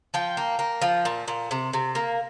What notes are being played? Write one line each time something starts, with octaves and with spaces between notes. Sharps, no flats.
F3 G5
A#3
A#3
F3
A#2
A#2
C3
C3
A#3